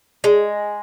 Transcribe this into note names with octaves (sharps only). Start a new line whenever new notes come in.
G#3